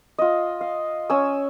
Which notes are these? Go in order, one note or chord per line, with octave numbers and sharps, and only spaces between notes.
F4 D#5
F5
C#4 G#5 D#6 E6